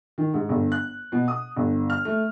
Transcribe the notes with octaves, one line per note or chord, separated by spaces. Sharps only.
D#3
G#2
G1
F#6
B2
D#6
G1
F6
A3